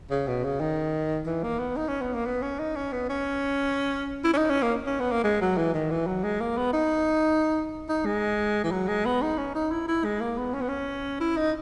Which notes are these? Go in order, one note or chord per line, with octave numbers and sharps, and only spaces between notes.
C#3
B2
C#3
D#3
E3
A#3
B3
D#4
C#4
B3
A#3
B3
C#4
D#4
C#4
B3
C#4
E4
C#4
D#4
C#4
A#3
C#4
B3
A#3
G#3
F#3
E3
D#3
E3
F#3
G#3
A#3
B3
D#4
D#4
G#3
E3
F#3
G#3
B3
D#4
C#4
D#4
E4
E4
G#3
A#3
B3
C#4
B3
C#4
E4
D#4